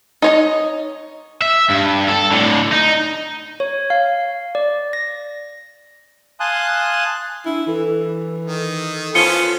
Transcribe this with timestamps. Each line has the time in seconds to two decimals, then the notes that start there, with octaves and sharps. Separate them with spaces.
0.22 D#4 C#5 D#5
1.42 E5
1.70 G2
2.08 A4
2.32 A2 D3
2.73 D#4
3.60 C#5
3.90 F5
4.55 D5
4.93 A#6
6.40 F5 G#5 A5 C6 D#6 F#6
7.46 D4 E4
7.67 E3 A4
8.44 D#3
9.15 B3 C#4 F4 A4 C5 C#7 D#7 G7